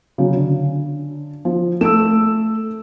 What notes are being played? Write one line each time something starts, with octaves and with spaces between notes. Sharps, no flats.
C#3 F#3
D3
F3
A3 E6 D7 E7